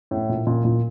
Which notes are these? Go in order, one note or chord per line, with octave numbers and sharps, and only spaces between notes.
A2
A#2
A#2
A#2